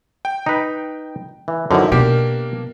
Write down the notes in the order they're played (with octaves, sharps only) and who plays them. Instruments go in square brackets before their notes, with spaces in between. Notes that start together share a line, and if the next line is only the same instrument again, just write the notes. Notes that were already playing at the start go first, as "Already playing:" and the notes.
[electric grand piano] G5
[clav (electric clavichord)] D#4 B4
E3
[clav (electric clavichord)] F#2 D3 F3 [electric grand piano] D#4 E4
[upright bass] B2 [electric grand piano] A#3 D4 A#4 [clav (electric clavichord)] G4